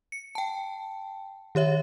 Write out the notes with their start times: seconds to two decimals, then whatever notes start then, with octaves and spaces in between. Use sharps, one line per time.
0.12 C#7
0.35 G5 A5
1.55 D#3 G4 C#5 E5